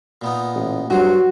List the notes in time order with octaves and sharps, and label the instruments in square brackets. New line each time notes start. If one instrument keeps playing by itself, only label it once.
[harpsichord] A#2 B3 D#4
[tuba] A1
[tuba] G2 [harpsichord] F#3 C5 [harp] F#4